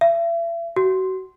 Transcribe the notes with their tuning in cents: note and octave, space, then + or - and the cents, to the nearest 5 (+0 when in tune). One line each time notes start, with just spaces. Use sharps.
E5 +40
F#4 +30